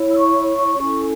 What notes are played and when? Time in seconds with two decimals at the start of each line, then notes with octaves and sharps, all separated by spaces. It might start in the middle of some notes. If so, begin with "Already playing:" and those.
Already playing: E4 C#5
0.11 E6
0.19 C#6
0.79 C#4 E4 A4